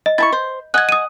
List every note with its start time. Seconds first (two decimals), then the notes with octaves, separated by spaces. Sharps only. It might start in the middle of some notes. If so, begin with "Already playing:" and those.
0.06 D#5
0.18 E4 A5 C#6 A6
0.32 C5
0.74 D#5 F#5 G#5 F#6 G#6
0.89 D#6 D#7